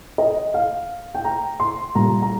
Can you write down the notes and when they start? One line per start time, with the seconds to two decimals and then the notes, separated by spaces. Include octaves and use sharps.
0.18 D#5
0.54 F5
1.15 G5
1.24 A#5
1.60 C6
1.95 A#2 G3 A#5
2.22 A#5